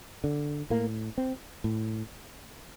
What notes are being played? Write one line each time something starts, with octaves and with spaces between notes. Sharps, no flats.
D3
A2 A#3
C4
A2